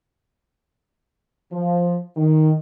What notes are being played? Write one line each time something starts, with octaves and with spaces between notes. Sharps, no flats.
F3
D#3